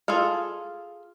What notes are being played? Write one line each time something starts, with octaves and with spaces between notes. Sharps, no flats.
F4 G#4 A4 F5